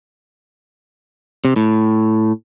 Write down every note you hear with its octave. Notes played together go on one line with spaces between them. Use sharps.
C3
A2